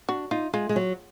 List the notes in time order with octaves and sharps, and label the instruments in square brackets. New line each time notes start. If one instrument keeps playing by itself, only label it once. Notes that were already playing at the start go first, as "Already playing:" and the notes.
[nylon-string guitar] D4 [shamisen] F#4
[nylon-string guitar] D#4 [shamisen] F4
[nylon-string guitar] G#3 [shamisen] F4
[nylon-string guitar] G#3
F#3